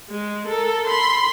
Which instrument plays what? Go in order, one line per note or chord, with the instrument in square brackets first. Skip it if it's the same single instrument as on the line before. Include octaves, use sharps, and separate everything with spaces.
[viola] G#3
A4 A#4
B5 C6